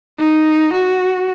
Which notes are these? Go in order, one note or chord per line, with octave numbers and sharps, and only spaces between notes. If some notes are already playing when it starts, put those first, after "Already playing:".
D#4
F#4